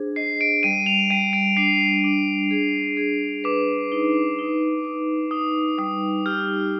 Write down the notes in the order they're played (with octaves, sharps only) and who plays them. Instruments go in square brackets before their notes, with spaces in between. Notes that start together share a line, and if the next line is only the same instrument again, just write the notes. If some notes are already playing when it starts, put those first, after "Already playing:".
Already playing: [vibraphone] D4 G#4 C5
[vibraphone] D#5 [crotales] C7
[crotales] D7
[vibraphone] G3 [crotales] D#7
[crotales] F7
[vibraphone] G3 [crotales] D#7
[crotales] D7
[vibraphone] D4 [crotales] C7
[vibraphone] D4
G#4
G#4
[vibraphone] B4 [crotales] D6
[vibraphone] D#4
D#4
D#4
[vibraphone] D#4 [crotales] D#6
[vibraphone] G3 [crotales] D#6
[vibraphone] G4 [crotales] F6